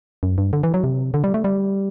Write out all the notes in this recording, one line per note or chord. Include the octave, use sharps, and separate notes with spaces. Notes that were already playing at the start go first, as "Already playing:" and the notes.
F#2
G2
D3
E3
F#3
C3
D3
G3
A3
G3